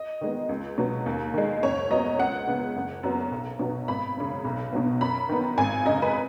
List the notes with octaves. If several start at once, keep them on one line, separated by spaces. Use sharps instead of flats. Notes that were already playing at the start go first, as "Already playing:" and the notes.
Already playing: D#5
D#3 G#3 B3
C#2
B2 F#3 B3
D#2
D#3 G#3
F#1 C#5
F#2 F#3 B3 D#5
C#2 F#5
C#3 B3
F#1
F#2 F#3 B3
B1
B2 F#3 B3
G#1 B5
F#2 C#3
B1
B2 F#3 B3
F#2 B5
D#3 B3
G#1 G#5
F#2 C#3 D#5
B4